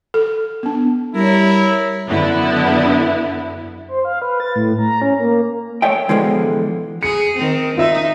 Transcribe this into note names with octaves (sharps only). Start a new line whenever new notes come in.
A4
B3 D4
G3 E4 A#4 C#5
F#2 D3 B3 E4
C5
F5
B4
A6
A2
A#5
C#4
A#3
A3 C#5 E5 G5
B2 D3 E3 F3 G#3
G#4 C#7
D#3 C4
D#4 F4 E5